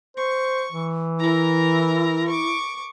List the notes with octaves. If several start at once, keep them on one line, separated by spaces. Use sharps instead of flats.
C5 C#6
E3
E4 A#4 A#5
C#6 D6